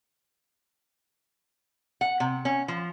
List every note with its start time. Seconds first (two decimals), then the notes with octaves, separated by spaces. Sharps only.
2.01 F#5
2.20 C3
2.45 C#4
2.68 F3